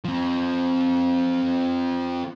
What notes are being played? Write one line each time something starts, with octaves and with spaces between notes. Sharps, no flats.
F3 C4